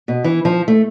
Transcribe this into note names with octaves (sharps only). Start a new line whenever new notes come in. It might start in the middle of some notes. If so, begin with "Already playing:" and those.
B2
E3
F3
A3